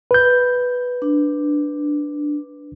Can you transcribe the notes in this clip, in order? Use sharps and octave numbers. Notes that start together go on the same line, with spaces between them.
B4 G6
D4